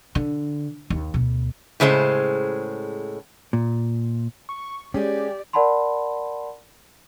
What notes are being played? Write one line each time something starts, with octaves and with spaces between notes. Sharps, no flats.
D3
D#2
D2 B2
A2 C#3 G#3 C5
A#2
C#6
G#3 C#4 G4 G#4 D5
A#4 D5 F#5 A5 B5 C6